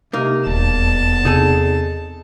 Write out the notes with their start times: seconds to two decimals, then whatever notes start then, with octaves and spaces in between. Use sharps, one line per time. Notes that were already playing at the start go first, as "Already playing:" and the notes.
0.13 C3 A#3 D#4
0.47 D#1 E2 A5
1.25 C3 D#4 G#4 A4